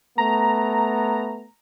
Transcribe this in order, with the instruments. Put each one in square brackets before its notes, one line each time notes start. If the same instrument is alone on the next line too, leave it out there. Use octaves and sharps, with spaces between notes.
[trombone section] A3 B3 [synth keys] A#5